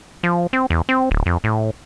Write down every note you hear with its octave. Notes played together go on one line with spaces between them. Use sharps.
F3
C4
E2
C4
D1
F2
A2